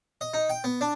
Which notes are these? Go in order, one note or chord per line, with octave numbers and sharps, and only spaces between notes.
D#5
D#4
G5
B3
D4